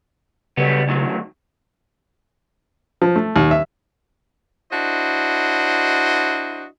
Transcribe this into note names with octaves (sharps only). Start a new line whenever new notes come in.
C#3 F#3 G3 B3
D2 D#3 F#3
F3
A3
D#2
E5
D4 E4 F#4 C5 D#5